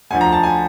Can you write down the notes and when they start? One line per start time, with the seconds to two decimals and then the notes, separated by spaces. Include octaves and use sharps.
0.10 D2 D3 F3 G#5
0.21 A#5
0.32 A5
0.43 G#5